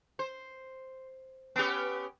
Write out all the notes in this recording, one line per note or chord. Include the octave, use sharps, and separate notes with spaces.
C5
B3 C#4 G4